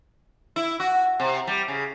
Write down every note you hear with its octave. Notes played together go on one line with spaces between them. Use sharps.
E4
F#4
C3
G3
C#3